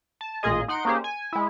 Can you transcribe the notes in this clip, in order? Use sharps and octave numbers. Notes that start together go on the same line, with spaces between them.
A5
A1 A#2 F4 G#4 D#5
D#4 F#5 C6 D7
A#3 C#4 D#4 G4 G#4 C5
G#5
G#3 E4